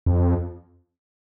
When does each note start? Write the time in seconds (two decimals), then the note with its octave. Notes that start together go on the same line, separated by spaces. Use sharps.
0.06 F2